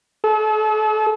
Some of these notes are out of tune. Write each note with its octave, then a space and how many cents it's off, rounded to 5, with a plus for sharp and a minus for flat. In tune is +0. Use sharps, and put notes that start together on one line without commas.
A4 -40